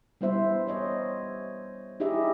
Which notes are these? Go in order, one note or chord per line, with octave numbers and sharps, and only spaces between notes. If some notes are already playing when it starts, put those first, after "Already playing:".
G3 B3 E4 C5 E5
C5 C#5 D#5
D#4 E4 G4 G#4 D#5 E5